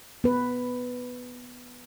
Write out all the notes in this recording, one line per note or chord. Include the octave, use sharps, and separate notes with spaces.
B3 B4